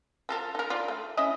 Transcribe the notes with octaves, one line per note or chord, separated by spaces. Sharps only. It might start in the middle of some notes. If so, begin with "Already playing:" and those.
F3 A4 A#4
D#4 A#4
F4 D5
A3
C#4 E4 D#5